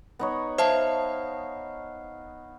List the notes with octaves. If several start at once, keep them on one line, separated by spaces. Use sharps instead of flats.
B3 D#4 C#5
C5 E5 F5 A5